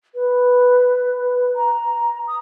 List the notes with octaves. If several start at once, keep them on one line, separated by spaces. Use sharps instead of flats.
B4
A#5
D#6